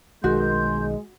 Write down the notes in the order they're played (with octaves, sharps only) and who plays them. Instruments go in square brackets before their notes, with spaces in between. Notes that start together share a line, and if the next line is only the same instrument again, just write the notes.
[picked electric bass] B1 D#3 [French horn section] G#3 [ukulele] F#4 [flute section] A#4 C6 G6